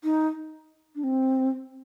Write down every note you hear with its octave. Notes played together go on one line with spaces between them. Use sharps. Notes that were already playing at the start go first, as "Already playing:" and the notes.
D#4
D4
C4